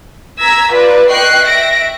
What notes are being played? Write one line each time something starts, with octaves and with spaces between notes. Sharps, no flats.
A#5 E6 G#6 B6
F4 B4 D5
D#5 G5 C#6 F#6 C7
E5 A#6 D7